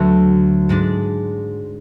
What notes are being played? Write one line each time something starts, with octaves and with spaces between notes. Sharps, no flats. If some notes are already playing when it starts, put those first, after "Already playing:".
Already playing: D2 D3 F#3 A3
G#2 G#3 D4